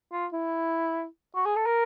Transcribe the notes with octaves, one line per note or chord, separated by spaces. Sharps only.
F4
E4
F#4
G#4
A4
A#4